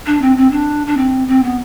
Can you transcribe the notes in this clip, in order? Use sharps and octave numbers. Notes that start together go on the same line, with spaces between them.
D4
C4
C4
D4
D4
C4
C4
B3